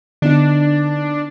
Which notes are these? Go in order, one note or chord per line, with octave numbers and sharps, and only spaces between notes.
D3 B3 D4 D#4